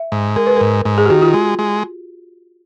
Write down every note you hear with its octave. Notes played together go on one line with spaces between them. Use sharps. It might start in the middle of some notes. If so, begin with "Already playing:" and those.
Already playing: E5
G#2
G#3 A#4
B4
G#2 A#4
G#2
G#4
G4
D#3 F#4
F4
G#3
G#3